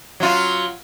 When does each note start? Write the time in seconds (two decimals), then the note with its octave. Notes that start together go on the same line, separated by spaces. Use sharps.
0.20 F#3 F4